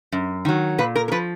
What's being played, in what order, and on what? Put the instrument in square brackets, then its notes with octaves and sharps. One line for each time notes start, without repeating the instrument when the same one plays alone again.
[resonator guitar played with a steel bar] F#2
D#3 F#3
A#2 B4
A#4
A#4
F3 B4